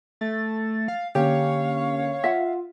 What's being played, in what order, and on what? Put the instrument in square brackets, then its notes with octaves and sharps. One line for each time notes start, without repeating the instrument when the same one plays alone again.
[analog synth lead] A3 [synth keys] A6
[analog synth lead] F5
[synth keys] D3 A#3 C#4 [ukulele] G4 [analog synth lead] C#5 [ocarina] F5
[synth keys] F4 [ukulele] E5 F#5